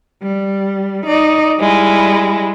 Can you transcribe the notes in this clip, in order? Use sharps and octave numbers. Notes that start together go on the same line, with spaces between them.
G3
D#4 D5
G3 G#3 E4